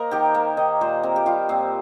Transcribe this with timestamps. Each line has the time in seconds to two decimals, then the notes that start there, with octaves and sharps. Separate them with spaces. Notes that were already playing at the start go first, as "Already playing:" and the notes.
Already playing: A#3 A#4 C5 D#5
0.11 D#3 G4
0.34 A#3
0.57 D#3 D#5
0.81 A#2 C5
1.03 C4 A#4
1.16 G4
1.26 G3 F4
1.49 A#2 C4